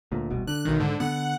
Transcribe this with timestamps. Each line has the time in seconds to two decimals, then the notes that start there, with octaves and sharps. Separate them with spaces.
0.12 D2 A#2
0.30 E1 C2 B2
0.47 D3 F#6
0.65 B1 D#3
0.80 G#2 D3
1.00 D3 B3 F#5